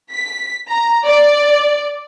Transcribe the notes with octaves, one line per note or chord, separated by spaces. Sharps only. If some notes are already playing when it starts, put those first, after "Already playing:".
B6
A#5
D5